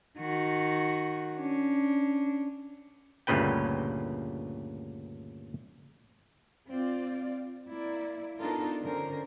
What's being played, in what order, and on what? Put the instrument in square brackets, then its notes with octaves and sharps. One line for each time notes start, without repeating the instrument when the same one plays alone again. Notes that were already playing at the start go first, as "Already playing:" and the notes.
[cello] D#3 F#4
C#4 D4
[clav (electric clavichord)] D2 G2 A#2 C#3 B4 G5
[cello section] C4 F4 D5
A#3 E4 D5
B3 D4 D#4 F4 A4 A#4
D3 C#4 A#4 C5